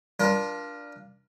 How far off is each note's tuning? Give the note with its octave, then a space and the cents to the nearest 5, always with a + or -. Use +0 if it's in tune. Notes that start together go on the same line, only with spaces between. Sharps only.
D4 +0 F4 +0 A#4 +35